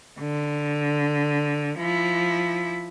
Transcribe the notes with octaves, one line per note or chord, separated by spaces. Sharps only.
D3
F3 E4